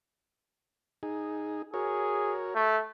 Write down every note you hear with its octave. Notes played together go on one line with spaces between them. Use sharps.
D#4 G#4
F#4 G#4 A#4 C#5
A3